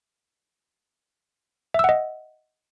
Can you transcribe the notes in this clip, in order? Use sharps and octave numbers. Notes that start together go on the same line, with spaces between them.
D#5 E5 F#5 E6